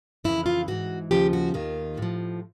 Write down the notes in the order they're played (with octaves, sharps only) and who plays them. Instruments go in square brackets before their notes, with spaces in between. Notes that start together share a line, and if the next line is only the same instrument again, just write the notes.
[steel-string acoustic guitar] F2 C#3 E3 E4
F4
G#2 E3 F#4
D#2 C#3 F3 G4
F#4
D#2 D#3 F4
A2 F3